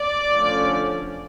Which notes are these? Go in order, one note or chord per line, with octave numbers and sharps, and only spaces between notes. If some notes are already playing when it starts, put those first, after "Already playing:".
Already playing: D5
D3 F3 A3 C#4